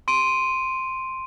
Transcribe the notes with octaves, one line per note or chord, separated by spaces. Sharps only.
C6 D7 D#7